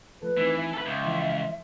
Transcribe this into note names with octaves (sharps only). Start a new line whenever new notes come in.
F3 A3 A4 B4
E3 A3 C4 D#4
E5
A4 B4
C#2
E3 F3 C6